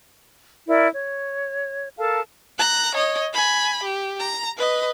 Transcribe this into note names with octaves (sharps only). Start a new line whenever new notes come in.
E4 A#4 D5
C#5
A4 A#4 F5 A5
A#5 F#6
C#5 D#5
G#5 B5
G4
A#5
B4 D#5